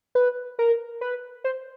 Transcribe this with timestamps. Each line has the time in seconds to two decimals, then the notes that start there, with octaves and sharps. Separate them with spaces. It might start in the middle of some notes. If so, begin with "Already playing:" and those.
0.15 B4
0.59 A#4
1.01 B4
1.44 C5